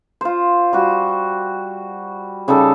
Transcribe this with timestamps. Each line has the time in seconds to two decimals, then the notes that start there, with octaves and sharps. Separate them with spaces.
0.21 F4 C5
0.73 G3 F#4
2.48 C#3 G3 D#4 A4